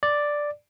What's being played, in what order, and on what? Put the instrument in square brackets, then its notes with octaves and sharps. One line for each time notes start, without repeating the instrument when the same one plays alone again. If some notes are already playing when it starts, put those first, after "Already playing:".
[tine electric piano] D5